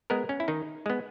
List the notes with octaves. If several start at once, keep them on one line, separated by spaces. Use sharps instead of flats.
G#3 B3 A#4
C#4
E4
D#3 D#4
G#3 B3